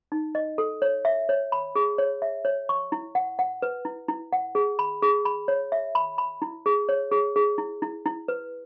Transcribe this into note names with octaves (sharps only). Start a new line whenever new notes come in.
D#4
D#5
A4
C#5
E5
C#5
B5
G#4
C#5
E5
C#5
C#6
E4
F#5
F#5
B4
E4
E4
F#5
G#4
B5
G#4
B5
C#5
E5
B5
B5
E4
G#4
C#5
G#4
G#4
E4
E4
E4
B4